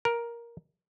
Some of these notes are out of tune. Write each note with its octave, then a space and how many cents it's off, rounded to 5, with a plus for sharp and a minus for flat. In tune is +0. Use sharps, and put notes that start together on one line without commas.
A#4 +10